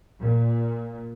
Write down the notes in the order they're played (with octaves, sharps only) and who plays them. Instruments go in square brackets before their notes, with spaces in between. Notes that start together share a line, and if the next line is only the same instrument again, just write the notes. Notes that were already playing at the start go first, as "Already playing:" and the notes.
[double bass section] A#2